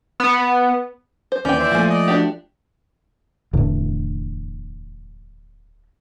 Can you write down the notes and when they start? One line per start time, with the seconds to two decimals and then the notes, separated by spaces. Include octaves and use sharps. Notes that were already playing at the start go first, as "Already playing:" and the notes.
0.20 B3
1.32 C5
1.45 D#2 E3 C#4 D5 G5 G6
1.59 C5 D5 E5
1.72 F3 A3 A#3 G#5
1.90 D5 D#5
2.08 D4 F#4 G4
3.53 D1 E2 A2 D3